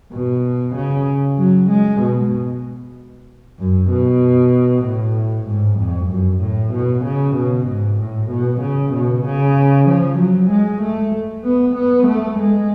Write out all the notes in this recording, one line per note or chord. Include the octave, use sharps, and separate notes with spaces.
B2
C#3
F#3
G#3
B2
F#2
B2
A2
G#2
F2
F#2
A2
B2
C#3
B2
G#2
A2
B2
C#3
B2
C#3
F3
F#3
G#3
A3
B3
B3
A3
G#3